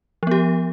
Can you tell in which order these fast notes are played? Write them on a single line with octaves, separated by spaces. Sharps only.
F3 B3 G4